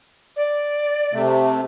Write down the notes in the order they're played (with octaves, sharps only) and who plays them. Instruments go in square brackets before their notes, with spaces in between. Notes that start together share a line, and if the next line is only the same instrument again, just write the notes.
[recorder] D5
[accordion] C3 A3